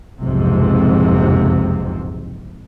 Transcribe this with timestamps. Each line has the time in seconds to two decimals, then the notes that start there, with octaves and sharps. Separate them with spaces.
0.19 F#1 B1 F2 G#2 C3